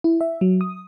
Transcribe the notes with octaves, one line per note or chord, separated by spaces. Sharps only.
E4
E5
F#3
D#6